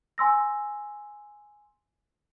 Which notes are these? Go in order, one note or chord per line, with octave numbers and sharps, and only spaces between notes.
G#5 C6 E6 A#6